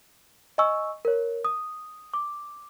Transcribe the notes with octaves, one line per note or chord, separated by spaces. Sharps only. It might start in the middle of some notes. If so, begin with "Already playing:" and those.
D#5 G#5 C#6 E6
A#4 C#5
D#6
D6